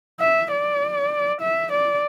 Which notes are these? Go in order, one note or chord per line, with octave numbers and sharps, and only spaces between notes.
E5
D5
E5
D5